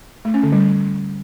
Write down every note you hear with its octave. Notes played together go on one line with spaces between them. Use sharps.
A3
C#4
D3
G3